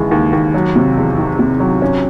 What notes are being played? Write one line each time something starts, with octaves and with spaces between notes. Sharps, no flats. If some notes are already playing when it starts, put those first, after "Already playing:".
Already playing: D#2 C#3 E3 G#3
D#2
D#2
F#3
C3
E2
D#3
C3
F#3
C#4